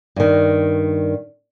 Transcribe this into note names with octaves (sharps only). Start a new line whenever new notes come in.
G2 D#3